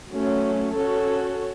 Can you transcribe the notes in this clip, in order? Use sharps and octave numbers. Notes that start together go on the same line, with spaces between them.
F#3 A3 C#4
C#4 F#4 A4 C#5